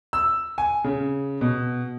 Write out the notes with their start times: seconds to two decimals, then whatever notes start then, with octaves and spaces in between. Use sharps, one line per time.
0.13 E6
0.58 G#5
0.84 C#3
1.41 B2